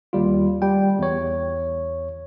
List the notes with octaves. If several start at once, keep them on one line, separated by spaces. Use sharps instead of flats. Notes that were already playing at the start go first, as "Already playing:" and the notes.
D#2 G3 F4
G3 G5
E2 C#5